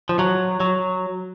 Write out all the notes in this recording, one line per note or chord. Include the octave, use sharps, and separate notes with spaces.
F3
F#3
F#3